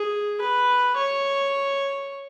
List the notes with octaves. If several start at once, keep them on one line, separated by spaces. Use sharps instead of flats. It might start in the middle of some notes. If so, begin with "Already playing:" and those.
Already playing: G#4
B4
C#5